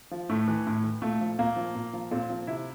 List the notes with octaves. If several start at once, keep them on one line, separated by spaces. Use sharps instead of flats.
F3
A2 A3
E3
A2
E3
A#2 A3
F3
A#2 A#3
F3
A#2
F3
A#2 C4
F3
C3 E4